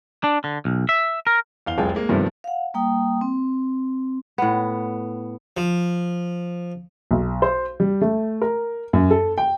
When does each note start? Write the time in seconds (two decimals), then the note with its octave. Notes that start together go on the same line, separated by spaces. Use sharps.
0.24 D4
0.44 D3
0.65 B1
0.89 E5
1.27 A#4
1.66 E2 F5 G7
1.78 F1 C2 F4 G#4 G5
1.95 G#3 A#3
2.09 G2 C3 D#3 F3 A3 B3
2.44 F5 F#5
2.74 G3 A#3 G5 D#6
3.21 C4
4.38 A2 B3
5.57 F3
7.11 B1
7.42 C5
7.80 G3
8.01 A3
8.42 A#4
8.93 F#2
9.11 A4
9.38 G5